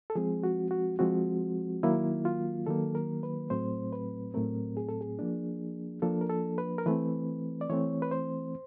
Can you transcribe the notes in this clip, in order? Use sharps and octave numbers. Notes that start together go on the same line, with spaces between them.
A4
F3 G#3 C4 G#4
F#4
F#4
F3 G#3 C4 F#4
D#3 F#3 A#3 E4
F4
D#3 F#3 A#3 A4
A#4
B4
A2 F#3 A3 C4 C5
B4
A2 F#3 A3 C4 A#4
G#4
A4
G#4
F3 A#3 D4
F3 A#3 D4 A4
A#4
A4
B4
A#4
E3 A3 C4 B4
D5
E3 A3 C4 C#5
B4
C5